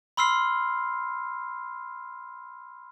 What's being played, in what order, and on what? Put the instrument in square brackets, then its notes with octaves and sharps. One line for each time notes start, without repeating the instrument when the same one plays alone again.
[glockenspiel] B5 C6 E6 F6 C7